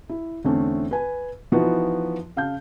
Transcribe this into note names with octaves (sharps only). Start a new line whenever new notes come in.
E4
E2 D3 A3 C4 C#4
B4 G#5
E3 F3 B3 D#4 E4 F#4
C#3 F5 A5 G6